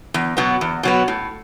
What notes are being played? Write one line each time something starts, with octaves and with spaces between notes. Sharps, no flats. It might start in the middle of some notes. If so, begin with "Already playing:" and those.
E2
B2 F#3 B3
E2
B2 F#3 B3
A2